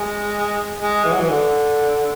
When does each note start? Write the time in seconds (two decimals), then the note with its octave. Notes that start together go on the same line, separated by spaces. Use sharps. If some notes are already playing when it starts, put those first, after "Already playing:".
Already playing: G#3
0.79 G#3
1.05 E3
1.12 F#3
1.20 E3
1.29 D3